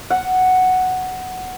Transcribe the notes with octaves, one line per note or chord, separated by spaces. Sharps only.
F#5